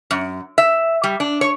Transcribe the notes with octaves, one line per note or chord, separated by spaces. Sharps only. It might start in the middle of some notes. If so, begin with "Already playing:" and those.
F#2
E5
G3
D4
C#5